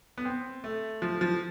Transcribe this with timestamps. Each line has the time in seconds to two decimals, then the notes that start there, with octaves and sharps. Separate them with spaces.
0.18 B3
0.25 C4
0.64 A3
1.02 F3
1.21 F3